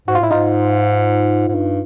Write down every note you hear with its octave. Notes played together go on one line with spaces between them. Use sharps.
G#2 F#4
F4
A2 E4
G#2 D#4 F4
G#2
G2